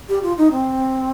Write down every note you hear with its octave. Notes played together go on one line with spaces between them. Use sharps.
G4
F4
D#4
C4